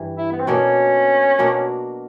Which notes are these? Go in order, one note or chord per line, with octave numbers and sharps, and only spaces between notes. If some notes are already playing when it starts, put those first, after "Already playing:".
Already playing: G2 E3 G3
E4
B3
C4
B2 F#3 A#3 C#4 D4
B2 F#3 A#3 D4